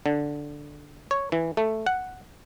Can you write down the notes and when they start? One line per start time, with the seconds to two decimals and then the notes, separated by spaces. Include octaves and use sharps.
0.06 D3
1.11 C#5
1.32 E3
1.57 A3
1.86 F#5